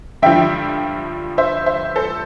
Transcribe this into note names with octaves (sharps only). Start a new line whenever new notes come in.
G2 D3 F3 E5 G5
C5 E5
C5 E5
A4 C5